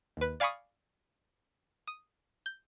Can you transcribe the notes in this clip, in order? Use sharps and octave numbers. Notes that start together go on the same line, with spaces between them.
D#2 B4
D5 F5 G#5 B5 C#6 D#6
D#6
G6